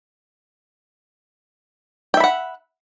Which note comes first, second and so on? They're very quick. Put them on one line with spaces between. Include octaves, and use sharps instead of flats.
G5 E5 B5 F#5